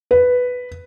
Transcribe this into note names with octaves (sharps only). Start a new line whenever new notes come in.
B4